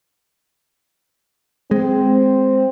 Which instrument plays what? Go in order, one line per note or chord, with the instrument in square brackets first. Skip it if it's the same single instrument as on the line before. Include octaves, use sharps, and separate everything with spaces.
[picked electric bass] G#3 [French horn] C4